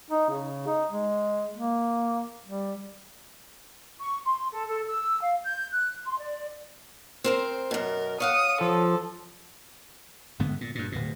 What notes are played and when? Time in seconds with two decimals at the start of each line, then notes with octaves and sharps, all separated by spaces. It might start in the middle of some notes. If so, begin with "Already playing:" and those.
0.10 D#4
0.30 C#3
0.66 D#4
0.90 G#3
1.54 A#3
2.45 G3
4.00 C#6
4.25 C6
4.52 A4
4.68 A4
4.87 E6
5.22 F5
5.45 G6
5.71 F#6
6.06 C6
6.18 D5
7.24 C4 A#4 C5
7.71 F#2 B2 A#4
8.20 C#5 F5 F#5 D#6
8.61 F3 A4
10.39 G1 G#2 D3 B3
10.61 A#2
10.75 G2 A#2
10.92 D1 B2